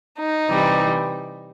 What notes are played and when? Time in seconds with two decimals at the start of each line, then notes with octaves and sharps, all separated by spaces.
0.18 D#4
0.48 C3 E3 G3